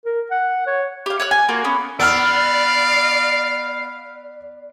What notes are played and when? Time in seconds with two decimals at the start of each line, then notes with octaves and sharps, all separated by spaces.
0.05 A#4
0.31 F#5
0.67 C#5
1.06 G4 F5
1.20 C#5 F#5 F#6
1.31 G#5
1.49 A#3 F4 F#4
1.65 B3 C#4
2.00 B3 D5 F5 E6 F6